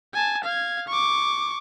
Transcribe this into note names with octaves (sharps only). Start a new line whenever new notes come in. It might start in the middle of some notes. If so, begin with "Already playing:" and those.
G#5 A5
F5 G#6
C#6 D6